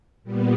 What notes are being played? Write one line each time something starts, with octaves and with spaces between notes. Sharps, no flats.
A#2 G3 B3